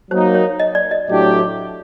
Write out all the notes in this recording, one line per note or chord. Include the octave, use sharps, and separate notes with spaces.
F#3 A#3 D#4 C5
C#5
D#5
D5
D#5
A2 F#3 A3 D4 G4